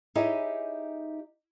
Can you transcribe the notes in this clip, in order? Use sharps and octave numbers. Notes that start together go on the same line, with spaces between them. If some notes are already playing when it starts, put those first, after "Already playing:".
D#4 E4 G4 G#4 C#5 D#5